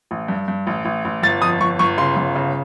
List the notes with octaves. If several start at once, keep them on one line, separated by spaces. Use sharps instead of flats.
A1
G2
G2
A1
A1
A1
G1 A6
F2 D#6
G1 C#6
G1 C#6
C#3 C6
G1
C#3